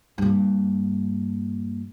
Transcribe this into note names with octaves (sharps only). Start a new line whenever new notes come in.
G2 A#2